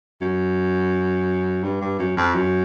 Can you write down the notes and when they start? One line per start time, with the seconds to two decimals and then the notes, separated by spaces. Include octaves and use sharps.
0.21 F#2
1.63 G2
1.81 G2
1.99 F#2
2.17 F2
2.35 F#2